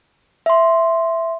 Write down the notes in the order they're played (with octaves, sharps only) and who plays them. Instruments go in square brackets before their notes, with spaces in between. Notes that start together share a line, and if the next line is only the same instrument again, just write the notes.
[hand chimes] E5 C6